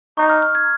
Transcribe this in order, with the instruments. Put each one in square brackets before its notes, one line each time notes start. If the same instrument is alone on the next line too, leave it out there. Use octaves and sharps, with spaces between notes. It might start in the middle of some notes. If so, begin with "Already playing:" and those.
[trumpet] D#4 [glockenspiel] C#6
[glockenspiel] F6
F6
G#6